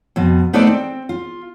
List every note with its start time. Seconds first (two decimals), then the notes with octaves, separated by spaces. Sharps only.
0.16 F2 B2
0.53 A3 B3 D#4 A4 C5 D5
0.67 C4
1.09 F4